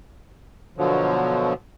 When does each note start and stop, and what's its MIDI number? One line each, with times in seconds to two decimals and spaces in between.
0.78 1.53 47
0.78 1.53 50
0.78 1.53 53
0.78 1.53 54